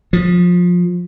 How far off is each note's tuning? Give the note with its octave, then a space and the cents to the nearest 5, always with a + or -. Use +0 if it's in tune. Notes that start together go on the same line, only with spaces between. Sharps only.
F3 +20